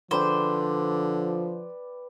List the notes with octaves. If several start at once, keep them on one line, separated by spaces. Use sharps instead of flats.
D3 F3 B4 C5 D5 G5